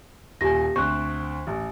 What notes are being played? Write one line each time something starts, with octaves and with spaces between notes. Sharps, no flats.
D#1 G4 G#5 A#6
D2 C4 C5 C#6 F#6
A1